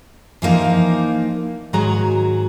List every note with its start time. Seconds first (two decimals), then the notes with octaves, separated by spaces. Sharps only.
0.42 E3 F3 A#3 D#4
1.73 G#2 D#3 F#3 F#4 G#4 A#5